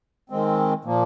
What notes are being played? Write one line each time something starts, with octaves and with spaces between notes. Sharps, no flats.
D#3 G#3 C4
A#2 F3 A#3